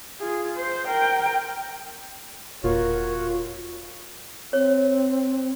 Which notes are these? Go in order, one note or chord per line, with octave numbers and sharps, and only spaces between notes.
F4 G#4
C5
A#4 G5
E1 A#2 F4 F#4 A#4 C#5
C4 C#5